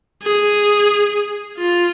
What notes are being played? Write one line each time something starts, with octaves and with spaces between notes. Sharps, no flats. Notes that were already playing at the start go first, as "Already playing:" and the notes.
G#4
F4